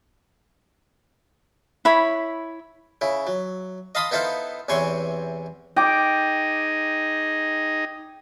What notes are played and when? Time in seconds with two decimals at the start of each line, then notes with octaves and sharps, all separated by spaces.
1.85 E4 C#5 B5
3.01 C#3 E4
3.27 F#3
3.95 D#5 F5 A5 B5 C6 D#6
4.11 B3 D#4 E4 A4 C5 F5
4.69 E2 C3 E3 C#5 G#5 C6
5.76 D#4 G#4 D#5 G5 D6